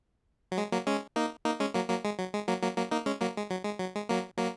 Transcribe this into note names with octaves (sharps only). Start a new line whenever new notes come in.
F#3
G#3
F#3 A#3
G#3 C#4
A#3 D#4
A#3 D#4
G#3 C#4
F#3 A#3
F#3 A#3
G#3
F#3
G#3
F#3 A#3
F#3 A#3
F#3 A#3
A#3 D#4
G#3 C#4
F#3 A#3
G#3
F#3
G#3
F#3
G#3
F#3 A#3
F#3 A#3